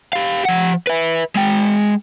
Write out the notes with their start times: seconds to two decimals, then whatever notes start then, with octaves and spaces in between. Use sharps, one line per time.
0.13 G4 F5
0.45 F3 F#5
0.87 B4 E5
1.35 G#3 G5